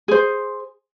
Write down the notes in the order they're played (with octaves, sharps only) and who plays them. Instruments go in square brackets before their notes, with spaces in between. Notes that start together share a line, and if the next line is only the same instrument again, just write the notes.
[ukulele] G#4 C5